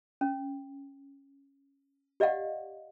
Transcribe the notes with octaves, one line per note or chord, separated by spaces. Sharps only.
C#4
G4 D5 D#5 F5 F#5